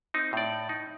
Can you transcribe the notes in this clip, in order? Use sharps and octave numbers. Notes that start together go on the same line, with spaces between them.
C4 D#4
A2 D5
D#4